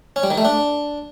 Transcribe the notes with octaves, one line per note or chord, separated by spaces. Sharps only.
C#4
G3
D#3
A3
D4